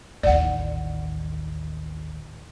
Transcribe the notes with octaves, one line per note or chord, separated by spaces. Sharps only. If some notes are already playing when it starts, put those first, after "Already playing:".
A1 D#2 D5 F#5